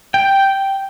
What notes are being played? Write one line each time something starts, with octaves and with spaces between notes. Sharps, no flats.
G5